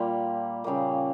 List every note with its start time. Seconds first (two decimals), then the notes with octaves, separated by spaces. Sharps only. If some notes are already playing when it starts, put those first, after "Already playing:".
Already playing: A#2 G3 A#3 F4
0.64 C#3 G3 A#3